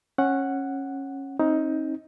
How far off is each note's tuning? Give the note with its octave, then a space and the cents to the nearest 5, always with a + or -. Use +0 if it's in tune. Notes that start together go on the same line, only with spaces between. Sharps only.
C#4 -20 F#5 +0
C4 +45 D#4 +15